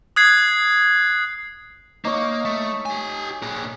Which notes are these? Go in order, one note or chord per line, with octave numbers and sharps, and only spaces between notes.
D#6 F#6 G#6 C7
A#3 D#4 C#5
A3
G4 G#5
A#2 G#4